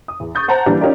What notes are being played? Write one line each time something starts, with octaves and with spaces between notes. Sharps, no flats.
D#6
E2
C#6 D#6 G6 A6
C5 F#5 A5 A#5
E3 G3 A#3 D4
C#4 D#4 F4 G4 A#4 D5